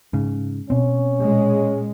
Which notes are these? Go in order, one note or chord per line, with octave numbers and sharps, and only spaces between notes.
G#2 C#3
B2 C4 C#4
A#2 G#3